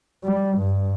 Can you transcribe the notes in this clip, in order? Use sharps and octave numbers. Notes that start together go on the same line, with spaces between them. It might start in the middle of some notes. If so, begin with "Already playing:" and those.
G3
G2